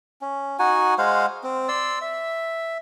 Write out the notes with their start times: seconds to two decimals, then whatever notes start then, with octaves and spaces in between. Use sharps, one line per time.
0.21 C#4
0.59 D#4 F#4 F#5 G#5
0.98 G#3 C5 F5 F#5
1.44 C4
1.68 D5 C6 E6
2.01 E5